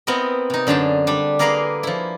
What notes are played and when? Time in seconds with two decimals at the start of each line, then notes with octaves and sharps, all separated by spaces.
0.07 B3 C4 E4 A#4 D#5
0.50 C3 D#4
0.67 F#2 D3 G#4 G5 A5
1.07 G3 D4
1.39 A#3 G#4 A#4 B4 A#5 C6
1.83 F3 E4